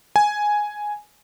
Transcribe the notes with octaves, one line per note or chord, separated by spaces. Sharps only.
G#5